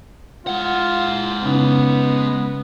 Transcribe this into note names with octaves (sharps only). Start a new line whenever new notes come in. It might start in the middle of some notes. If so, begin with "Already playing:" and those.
G#3 F4 F#5
C#3 B3 C#4 D#4